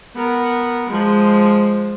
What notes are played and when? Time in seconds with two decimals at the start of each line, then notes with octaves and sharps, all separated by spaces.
0.15 B3 A#4
0.90 F3 G#3